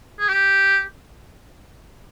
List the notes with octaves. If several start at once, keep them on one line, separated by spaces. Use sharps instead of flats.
G#4
G4